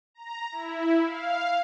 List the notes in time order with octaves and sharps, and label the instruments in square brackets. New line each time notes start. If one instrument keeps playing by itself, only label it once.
[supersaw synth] A#5
E4
F5